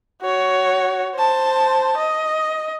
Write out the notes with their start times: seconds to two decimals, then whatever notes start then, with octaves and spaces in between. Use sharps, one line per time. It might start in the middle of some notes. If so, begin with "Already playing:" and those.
0.22 F#4 C#5
1.15 C5 A5
1.97 D#5